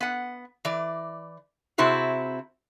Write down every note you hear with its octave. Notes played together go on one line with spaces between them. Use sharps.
B3 F#5
E3 D5
C3 C4 E4 F#4 G#4